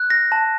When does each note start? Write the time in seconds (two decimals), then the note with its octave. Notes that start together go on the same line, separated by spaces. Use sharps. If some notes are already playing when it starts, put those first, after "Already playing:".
Already playing: F#6
0.10 A#6
0.32 A5